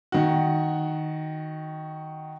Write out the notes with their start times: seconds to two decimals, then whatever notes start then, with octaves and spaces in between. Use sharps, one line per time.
0.12 D#3 F#4